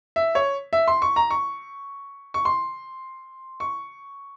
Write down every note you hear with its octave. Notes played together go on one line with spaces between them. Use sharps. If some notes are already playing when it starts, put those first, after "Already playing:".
E5
C#5
E5
C6
C#6
A#5
C#6
C#6
C6
C#6